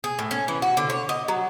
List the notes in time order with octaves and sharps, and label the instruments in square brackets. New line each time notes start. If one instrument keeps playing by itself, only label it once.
[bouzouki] G#4
A2
C#4
E3
F#4
D3
C#5
D#5
F#3